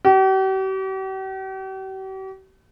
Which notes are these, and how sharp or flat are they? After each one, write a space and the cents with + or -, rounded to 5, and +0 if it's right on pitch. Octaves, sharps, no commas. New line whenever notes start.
G4 -45